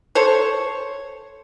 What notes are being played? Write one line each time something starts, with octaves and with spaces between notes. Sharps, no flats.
A4 C5 C#5